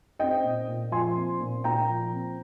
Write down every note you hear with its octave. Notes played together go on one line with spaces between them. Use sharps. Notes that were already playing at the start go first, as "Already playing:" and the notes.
C4 D#5 G5
A#2
A#2
F3 G#5 C6
C4
A#2
A#2 G5 A#5
F3
C4